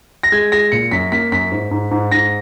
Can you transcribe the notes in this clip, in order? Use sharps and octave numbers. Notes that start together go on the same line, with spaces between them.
A#6
G#3 G#6
G#3 A#6
A#2 C#7
F#2 B6
A#3 B6
F#2 B6
G#2
G#2
G#2
G#2 A#6